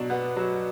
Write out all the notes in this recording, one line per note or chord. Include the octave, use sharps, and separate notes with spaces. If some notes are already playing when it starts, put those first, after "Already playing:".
Already playing: B2 F#3 D4
B3
F#3